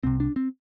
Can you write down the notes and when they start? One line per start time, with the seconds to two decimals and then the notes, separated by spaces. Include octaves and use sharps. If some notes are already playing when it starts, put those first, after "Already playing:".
0.03 C2 C3 C4
0.20 D4
0.36 C4